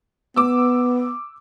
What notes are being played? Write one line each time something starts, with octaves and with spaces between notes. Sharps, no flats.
B3 D6 E6